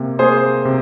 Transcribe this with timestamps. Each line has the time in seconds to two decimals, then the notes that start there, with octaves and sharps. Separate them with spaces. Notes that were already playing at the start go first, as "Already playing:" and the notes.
Already playing: C3 A#3
0.19 A#3 G#4 C5
0.65 C3